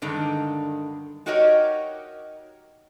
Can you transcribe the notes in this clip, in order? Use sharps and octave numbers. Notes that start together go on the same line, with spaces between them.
G2 D3 D#3 G#3
D#4 F#4 G4 A#4 C#5 D#5